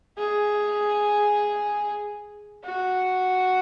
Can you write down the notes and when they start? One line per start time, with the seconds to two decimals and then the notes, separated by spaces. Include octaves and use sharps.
0.18 G#4
2.64 F#4